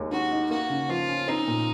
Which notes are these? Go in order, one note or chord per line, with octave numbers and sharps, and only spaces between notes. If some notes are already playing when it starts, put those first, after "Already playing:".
Already playing: D#2 G#3
D#3 F#4
D#4
A#3 F#4
C#3
F3 F4
C#4
C4 D#4
A#2